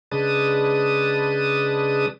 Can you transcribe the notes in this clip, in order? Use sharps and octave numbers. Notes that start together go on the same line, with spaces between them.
C#3 G#3 D4 B4 A5 D#6